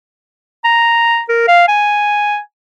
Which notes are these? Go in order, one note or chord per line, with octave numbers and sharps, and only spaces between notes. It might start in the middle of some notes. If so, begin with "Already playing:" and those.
A#5
A#4
F5
G#5